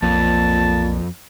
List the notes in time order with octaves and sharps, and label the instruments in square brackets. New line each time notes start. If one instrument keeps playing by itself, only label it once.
[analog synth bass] B1 [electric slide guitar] F2 [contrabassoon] A#2 [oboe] A5